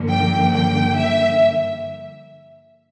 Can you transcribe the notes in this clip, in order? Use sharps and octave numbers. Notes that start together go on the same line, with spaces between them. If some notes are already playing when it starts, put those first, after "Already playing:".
Already playing: G2 D3 F3 A#3
G5
G5
E5